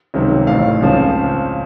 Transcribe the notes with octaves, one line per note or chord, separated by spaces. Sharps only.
C#2 C3 D#3 F#3 C4
A1 A2 A3 F5
C#2 C#3 F3 C4